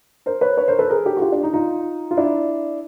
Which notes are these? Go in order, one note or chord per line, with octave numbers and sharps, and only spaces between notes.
A#4 C5
B4 C#5
B4 C#5
A#4 C5
A4 B4
G#4 A#4
G4 A4
F#4
F4 G4
D4
D#4
D#4 F4
F4
D4 E4